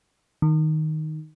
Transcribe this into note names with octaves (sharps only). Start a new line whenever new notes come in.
D#3